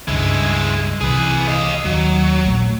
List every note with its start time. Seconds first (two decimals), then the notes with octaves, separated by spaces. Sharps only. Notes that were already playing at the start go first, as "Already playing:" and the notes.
0.08 C#2 G2 G#3 E4
1.01 C2 C3 E3 G#4 B4
1.48 D#5 F5
1.85 D#2 F#3
2.45 A#1 A3